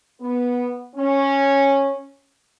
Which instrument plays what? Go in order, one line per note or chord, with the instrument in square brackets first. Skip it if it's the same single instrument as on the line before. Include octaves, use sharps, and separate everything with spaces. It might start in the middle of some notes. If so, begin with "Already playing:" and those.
[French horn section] B3
C#4